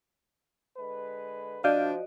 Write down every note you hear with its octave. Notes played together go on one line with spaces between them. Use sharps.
D3 G#3 B4
F3 D4 F#4 D5 D#5 F5 G6